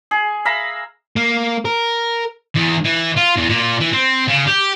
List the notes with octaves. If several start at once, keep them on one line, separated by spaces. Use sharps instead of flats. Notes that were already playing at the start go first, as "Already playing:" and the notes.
G#4
E5 F5 A#5 B5
A#3
A#4
E2
E3
F4
E2
A#2
E3
C4
C#3
G4